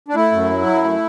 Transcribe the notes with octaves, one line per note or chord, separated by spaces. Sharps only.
D4
A3 E4
F#2
F#3
F#2
A3